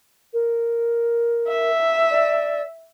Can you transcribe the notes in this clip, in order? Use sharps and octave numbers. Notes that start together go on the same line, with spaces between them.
A#4
E5
D5